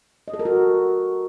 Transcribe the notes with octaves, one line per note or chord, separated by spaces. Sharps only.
D#5
A4
A#4
F#4